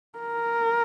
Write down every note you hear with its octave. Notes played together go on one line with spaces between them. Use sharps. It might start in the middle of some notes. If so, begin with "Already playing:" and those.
A#4